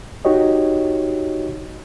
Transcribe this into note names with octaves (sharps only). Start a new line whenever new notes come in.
D#4 F#4 G4 C#5 D#5